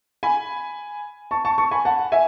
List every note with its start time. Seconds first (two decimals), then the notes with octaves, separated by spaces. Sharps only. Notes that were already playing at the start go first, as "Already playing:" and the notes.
0.23 G#5 B5
1.31 A5 C#6
1.45 A5 C#6
1.58 A5 C#6
1.71 G#5 B5
1.85 F#5 A5
2.12 E5 G#5